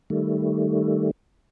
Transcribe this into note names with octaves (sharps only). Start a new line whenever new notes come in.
D#3 G3 A3